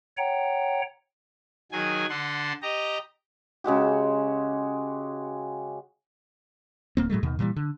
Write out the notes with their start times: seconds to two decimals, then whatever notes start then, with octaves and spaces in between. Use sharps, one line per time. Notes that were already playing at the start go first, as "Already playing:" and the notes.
0.17 C#5 F#5 G5 A#5
1.72 D#3 F#3 G#4 G#5
2.09 D3 A4 F#5 C6
2.62 G4 D#5 A#5
3.64 C#3 G#3 F#4 G4
6.97 D1 A#3 C4
7.10 A2 F#3 G#3 A3
7.23 D#2 B2 D#3
7.39 A#2 E3 F3 G3
7.56 D3